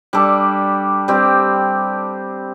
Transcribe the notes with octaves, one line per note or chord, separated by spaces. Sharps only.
G3 D4 A4 D5
G3 C4 G4